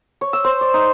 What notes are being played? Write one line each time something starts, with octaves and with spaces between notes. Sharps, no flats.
C#5
E6
C5
D5
D#4